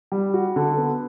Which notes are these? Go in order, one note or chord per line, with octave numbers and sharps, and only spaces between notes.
G3
F#4
D3
B3